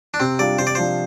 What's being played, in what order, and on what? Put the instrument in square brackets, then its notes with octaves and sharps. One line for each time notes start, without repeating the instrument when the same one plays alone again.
[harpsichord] D4
[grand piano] C3 [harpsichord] C4
[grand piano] G3 D4 F4 [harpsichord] D5
[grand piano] C3 [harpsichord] C5
[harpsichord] D5
[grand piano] F3 D4 F4 [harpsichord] C5